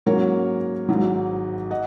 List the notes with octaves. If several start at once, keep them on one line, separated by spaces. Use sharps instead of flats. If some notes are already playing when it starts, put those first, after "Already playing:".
G#2 F#3 A#3 C#4 A#4 C#5
G#1 G#2 F#3
D#5 F#5